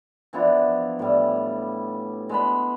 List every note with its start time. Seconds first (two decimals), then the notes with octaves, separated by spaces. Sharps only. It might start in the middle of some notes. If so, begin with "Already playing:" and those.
0.33 E3 F3 B3 D4
0.99 A2 G3
2.29 G#3 B3 B5